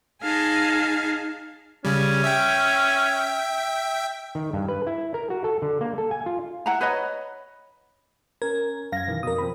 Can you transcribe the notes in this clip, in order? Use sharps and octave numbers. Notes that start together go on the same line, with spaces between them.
D#4 G#4 F5 G#5 A5
C#3 G3 C#4
E5 G5
D#3
G2
B4
E4
A#4
F#4
A4
D3
A#3
A4
G#5
F4
E4 F#5 A#5
B4 C#5 D#5 B5
C#4 A#4 G#6
F#2 F5 G#6 A#6
B2 D#3 E3
F2 B2 A#4 D#6
F3 C4 B5